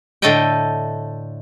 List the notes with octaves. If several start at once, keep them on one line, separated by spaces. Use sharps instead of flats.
A2 D3 A3 A4 D#5 G5